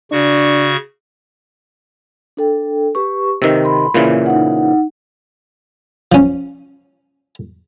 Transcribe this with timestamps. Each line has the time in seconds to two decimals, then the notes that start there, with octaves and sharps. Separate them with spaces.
0.12 C#3 D4 F#4 C#6
2.37 D4 A4 G5
2.95 G4 B4 C#6
3.42 C3 D#3 B4 E6
3.65 B5 C6
3.94 A#2 C#3 E3
4.26 D#4 F#5
6.12 F3 C#4